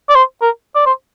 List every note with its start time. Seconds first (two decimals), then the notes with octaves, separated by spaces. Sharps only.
0.09 D5
0.15 C5
0.42 A#4
0.75 D5
0.86 C5